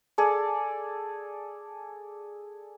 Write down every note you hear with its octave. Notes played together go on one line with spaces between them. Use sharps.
G#4 A4 D5